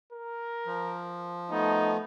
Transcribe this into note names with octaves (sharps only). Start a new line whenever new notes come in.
A#4
F3
A3 B3 D#4